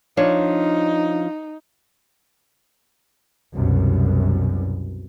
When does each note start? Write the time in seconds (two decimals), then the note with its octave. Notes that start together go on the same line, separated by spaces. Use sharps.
0.17 F3 D4 D#4 C#5
3.54 C2 F#2 B2